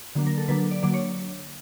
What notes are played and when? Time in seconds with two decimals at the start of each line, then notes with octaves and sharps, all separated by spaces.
0.15 D3 F#3 A#3 D4
0.27 A#4
0.38 A4
0.48 D3 F#3 A#3 D4 B4
0.71 D5
0.82 D3 F#3 A#3 D4 D5
0.94 C#5